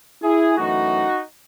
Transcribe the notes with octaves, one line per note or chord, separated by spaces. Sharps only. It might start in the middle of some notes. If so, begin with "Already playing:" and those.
E4 G#4
F#2 E3 A3 D#4 F#4